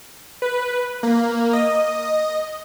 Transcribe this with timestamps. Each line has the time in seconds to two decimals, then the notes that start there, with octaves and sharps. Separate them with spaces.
0.42 B4
1.03 A#3
1.53 D#5